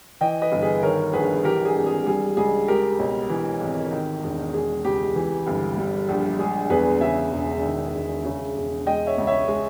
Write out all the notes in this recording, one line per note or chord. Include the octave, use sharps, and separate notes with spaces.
E3 D#5 G5
B4 D#5
G1
G#4 B4
D#3 A#4 C#5
A#1 G#4 B4
E3 G4 A#4
G#4
G#1
G#4
G3 G#4
C#2 G#4
G#3 G4 A#4
B1
E3
G#1
D#3
E1
G#3 G#4
C#2 G4
E3
G1
G3
A#1
G#3 G#4
E2 G#4 B4
C#3 E5 G#5
E1
D#3
E1
C#3
E1
G#3 D#5 G5
C#5 E5
C#2
C#5 E5
G#3